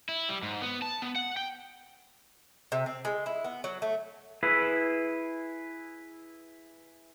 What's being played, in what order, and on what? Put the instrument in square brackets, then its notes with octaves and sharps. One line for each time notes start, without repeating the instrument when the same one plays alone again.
[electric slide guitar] E4
G3
G#2
B3
A5
B3
F#5
G5
[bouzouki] C3
C4
G#3
E4
B3
F#3
A3
[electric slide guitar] E4 G#4 B4